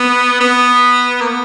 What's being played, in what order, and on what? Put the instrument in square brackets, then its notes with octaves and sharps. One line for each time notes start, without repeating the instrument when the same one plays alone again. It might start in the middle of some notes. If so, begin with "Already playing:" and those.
Already playing: [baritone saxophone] B3
B3
A#3
B3